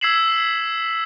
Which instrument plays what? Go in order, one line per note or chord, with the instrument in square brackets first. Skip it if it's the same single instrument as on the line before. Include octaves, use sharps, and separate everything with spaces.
[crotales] E6 G#6 B6 C7 E7 F#7